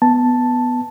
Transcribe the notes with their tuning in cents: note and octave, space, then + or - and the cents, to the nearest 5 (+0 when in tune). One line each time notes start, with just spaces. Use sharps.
B3 +0 A5 +0